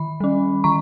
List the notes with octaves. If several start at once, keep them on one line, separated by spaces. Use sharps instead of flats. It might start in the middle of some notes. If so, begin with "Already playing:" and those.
Already playing: D#3 B5
G3 C#4
D#3 A#5 C#6